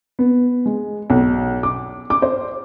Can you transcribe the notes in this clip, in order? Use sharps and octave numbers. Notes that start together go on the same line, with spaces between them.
B3
G#3
B1
D6
D6
C5